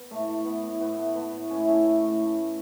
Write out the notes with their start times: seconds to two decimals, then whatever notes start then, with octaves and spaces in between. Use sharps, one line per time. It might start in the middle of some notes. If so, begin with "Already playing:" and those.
Already playing: B3
0.11 A2 A3
0.28 A3
0.45 A3 B3
0.63 A2
0.80 A2 B3
0.97 A3
1.15 A3 B3
1.32 A2
1.50 A2 C#4
1.60 E4
1.68 A3 C#4
1.85 A3
2.03 A2
2.20 A3